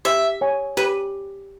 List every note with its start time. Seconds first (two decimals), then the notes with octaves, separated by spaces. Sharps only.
0.05 G4 E5
0.41 C#5 G#5
0.77 G4 B4